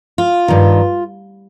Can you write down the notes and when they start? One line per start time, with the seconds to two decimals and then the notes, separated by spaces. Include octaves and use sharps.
0.18 F4
0.48 G2 D#3